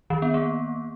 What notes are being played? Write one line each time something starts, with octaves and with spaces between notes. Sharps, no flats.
D#3
B3
A#3